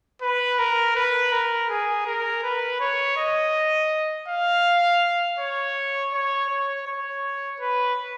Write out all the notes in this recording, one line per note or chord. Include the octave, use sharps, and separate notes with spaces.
B4
A#4
B4
A#4
G#4
A#4
B4
C#5
D#5
F5
C#5
C#5
C#5
C#5
B4